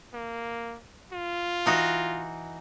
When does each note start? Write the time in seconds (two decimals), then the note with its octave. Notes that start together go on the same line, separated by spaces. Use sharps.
0.14 A#3
1.13 F4
1.66 E3 D#4 F#4